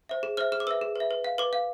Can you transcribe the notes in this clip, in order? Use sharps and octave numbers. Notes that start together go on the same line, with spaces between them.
C5 E5
G#4
C5 E5 F6
G#4 F6
D6
B4 E5 E6
G#4
B4 E5
B4
F5
B4 D6
F5